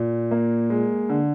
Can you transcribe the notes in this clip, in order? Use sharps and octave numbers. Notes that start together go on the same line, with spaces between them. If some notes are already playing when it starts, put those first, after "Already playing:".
Already playing: A#2
A#3
G#3
D3